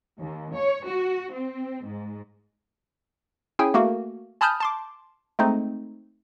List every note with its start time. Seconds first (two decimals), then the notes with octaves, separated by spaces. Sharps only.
0.20 D#2
0.55 C#5
0.88 F#4
1.32 C4
1.86 G#2
3.59 C#4 E4 G#4 G5 G#5
3.74 A3 A#3 F#4
4.41 G#5 A5 B5 D#6 F6 G6
4.60 A5 C6 D6
5.39 G#3 A3 C4 D#4